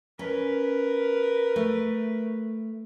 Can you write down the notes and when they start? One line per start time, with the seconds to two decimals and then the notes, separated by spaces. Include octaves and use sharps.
0.19 C#4 A#4 B4
1.56 A3